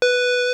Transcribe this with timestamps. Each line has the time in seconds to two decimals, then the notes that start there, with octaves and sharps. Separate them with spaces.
0.02 B4